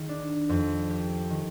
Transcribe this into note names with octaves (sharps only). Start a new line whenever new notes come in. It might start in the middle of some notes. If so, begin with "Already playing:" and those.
Already playing: D#3 G#4
D4
F2
G4
D#3